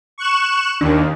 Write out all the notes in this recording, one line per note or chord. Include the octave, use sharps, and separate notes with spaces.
C#6 F#6 E7
D#2 D4